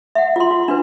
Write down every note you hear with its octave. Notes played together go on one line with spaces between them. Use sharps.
E5 F#5
F4 C6
F4
D4 F4 B4